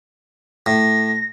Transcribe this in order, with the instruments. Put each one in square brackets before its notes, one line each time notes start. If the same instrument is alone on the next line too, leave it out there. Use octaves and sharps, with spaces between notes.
[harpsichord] A2 [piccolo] A#6